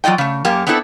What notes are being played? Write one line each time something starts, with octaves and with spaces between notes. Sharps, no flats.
F#3 F4 D5 D#5 G5
C#3 A3
F#2 A#3 G4
B3 C4 D4 E4 A4